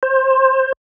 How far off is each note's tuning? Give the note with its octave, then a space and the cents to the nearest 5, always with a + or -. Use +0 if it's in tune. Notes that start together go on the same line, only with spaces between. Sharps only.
C5 +20